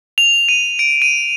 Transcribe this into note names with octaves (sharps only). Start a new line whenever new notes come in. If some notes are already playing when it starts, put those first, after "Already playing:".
F7
D#7
D7
D#7